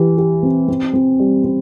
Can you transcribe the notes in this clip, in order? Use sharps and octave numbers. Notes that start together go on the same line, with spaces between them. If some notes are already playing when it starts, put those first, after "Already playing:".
Already playing: E3 G4
G4
C4
C4
C4
G3
C4